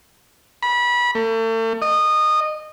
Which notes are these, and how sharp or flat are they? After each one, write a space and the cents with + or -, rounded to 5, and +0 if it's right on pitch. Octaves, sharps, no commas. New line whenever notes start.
B5 -25
A3 +40
D#5 -20